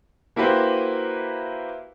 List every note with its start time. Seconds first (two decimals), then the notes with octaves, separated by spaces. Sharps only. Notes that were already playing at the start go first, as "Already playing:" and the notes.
0.36 A#3 E4 F#4 G4 B4 C5